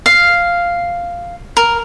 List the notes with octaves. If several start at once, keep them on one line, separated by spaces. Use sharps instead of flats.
F5
A#4